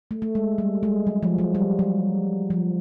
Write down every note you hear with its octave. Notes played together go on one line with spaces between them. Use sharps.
A3
A3
G#3
G3
G#3
F#3
F3
F#3
G3
F#3
F3